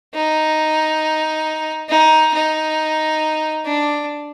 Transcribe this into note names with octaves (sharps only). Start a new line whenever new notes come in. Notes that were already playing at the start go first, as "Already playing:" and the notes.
D#4
D#4
D#4
D4